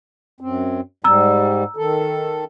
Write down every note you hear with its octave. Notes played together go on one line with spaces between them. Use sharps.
F#2 C4
G#2 G3 A#5 E6
D#3 A4